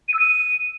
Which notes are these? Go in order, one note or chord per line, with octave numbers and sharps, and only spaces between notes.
D#7
E6
D#7